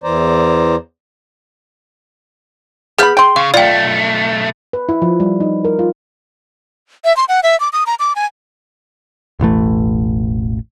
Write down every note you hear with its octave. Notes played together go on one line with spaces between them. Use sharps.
E2 E3 C5 D5 A#5
B3 G#4 F5 B5 F6 G6
G5 C6
C#3 F5
B1 A3 F4 D5 G5
B4
E4
F3
G3
D#4
A#4
F4
E5
C6
F#5
E5
D6
D#6
A#5
D6
G#5
E1 A1 E3 A3